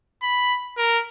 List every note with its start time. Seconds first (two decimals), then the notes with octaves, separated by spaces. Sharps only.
0.23 B5
0.78 A#4